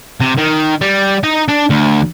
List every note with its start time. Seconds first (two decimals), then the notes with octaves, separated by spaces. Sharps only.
0.20 C3
0.38 D#3
0.81 G3
1.24 D#4 D#5
1.48 D4
1.70 D2